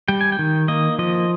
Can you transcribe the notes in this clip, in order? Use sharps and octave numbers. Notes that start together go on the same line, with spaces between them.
G3 G5
G#5
G5
D#3
A#3 D#5
F3 D#5